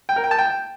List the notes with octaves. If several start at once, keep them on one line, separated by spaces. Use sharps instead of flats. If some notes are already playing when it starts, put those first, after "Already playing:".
G5
A#4
G5
A5
G5